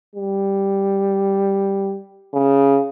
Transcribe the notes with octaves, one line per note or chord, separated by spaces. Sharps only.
G3
C#3